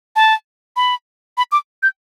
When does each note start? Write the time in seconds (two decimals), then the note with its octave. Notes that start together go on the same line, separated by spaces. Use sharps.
0.16 A5
0.76 B5
1.38 B5
1.52 D6
1.83 G6